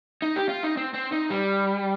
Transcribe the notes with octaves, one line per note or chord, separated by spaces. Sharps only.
D#4
G4
F4
D#4
C4
C4
D#4
G3